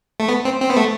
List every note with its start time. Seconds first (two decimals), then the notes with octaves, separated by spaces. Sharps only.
0.20 A3
0.29 B3
0.45 C4
0.61 C4
0.70 B3
0.76 A3